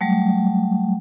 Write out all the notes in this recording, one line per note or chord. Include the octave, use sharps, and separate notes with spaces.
F#3 G3 A3